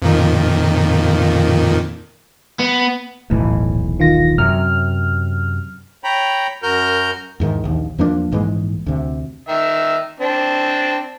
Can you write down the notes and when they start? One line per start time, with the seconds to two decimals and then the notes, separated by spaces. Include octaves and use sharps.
0.02 F2 A#2 D#3
2.59 B3
3.30 D#1 B1 A2 E3
4.00 D#3 F4 A#6
4.38 F#2 C3 F#3 F6
6.04 C#5 G5 A#5 B5
6.63 F#2 F#4 A#4 F6 G6
7.40 E2 G#2 D#3
7.64 A#1 D#2
7.98 E2 F3 A#3 D4
8.31 A#1 G#2 E3 G#3
8.86 D2 C3
9.48 D#3 E5
10.20 C4 D4